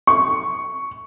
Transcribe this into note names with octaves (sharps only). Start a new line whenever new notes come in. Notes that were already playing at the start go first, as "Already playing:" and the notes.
C#6